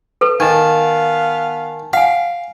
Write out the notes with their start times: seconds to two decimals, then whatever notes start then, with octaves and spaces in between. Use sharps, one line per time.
0.21 A4 B4
0.40 D#3 B3 F5 G#5 A5
1.93 F5 F#5 G#5